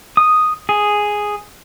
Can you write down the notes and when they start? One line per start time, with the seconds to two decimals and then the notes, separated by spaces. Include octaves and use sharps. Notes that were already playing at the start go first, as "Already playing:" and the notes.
0.17 D#6
0.69 G#4